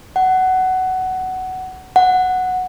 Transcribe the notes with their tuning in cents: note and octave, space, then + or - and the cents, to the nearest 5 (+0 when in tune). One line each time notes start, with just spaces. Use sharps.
F#5 +15
F#5 -5